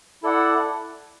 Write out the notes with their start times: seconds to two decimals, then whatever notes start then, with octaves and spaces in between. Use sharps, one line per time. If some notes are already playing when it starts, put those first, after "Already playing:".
0.23 E4 A4 D5 F#5